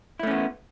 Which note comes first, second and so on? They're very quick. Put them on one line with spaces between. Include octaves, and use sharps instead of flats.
E4 A3 C#4 B3